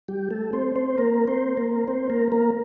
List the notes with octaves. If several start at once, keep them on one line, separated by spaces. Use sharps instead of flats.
G3 G4
A3 A4
C4 C5
C4 C5
A#3 A#4
C4 C5
A#3 A#4
C4 C5
A#3 A#4
A#3 A#4